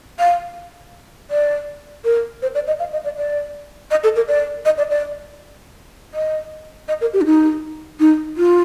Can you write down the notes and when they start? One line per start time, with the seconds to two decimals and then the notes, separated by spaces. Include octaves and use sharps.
0.19 F5
1.31 D5
2.05 A#4
2.42 C5
2.55 D5
2.67 D#5
2.79 F5
2.92 D#5
3.05 D5
3.17 D5
3.91 D#5
4.04 A4
4.16 A#4
4.28 D5
4.65 D#5
4.78 D5
4.90 D5
6.14 D#5
6.88 D#5
7.01 A#4
7.14 G4
7.21 D4
7.26 D#4
8.00 D#4
8.37 F4